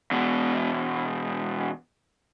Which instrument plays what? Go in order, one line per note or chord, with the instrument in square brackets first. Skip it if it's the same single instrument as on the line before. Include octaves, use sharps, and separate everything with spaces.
[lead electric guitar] E2 B2